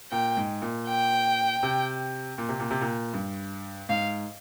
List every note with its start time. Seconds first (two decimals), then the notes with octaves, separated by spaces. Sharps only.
0.11 A#2 G5
0.37 G#2
0.62 A#2
0.88 G5
1.63 C3
2.38 A#2
2.49 C3
2.60 A#2
2.71 C3
2.81 A#2
3.14 G2
3.89 G#2 F5